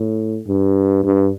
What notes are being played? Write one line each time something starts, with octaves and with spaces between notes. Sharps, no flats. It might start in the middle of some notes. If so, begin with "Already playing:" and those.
Already playing: A2
G2
G2